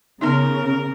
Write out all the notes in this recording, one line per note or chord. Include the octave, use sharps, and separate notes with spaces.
C#3 B3 D#4 A#4